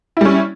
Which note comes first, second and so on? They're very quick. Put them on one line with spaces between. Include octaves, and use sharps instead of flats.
E4 G3 C#4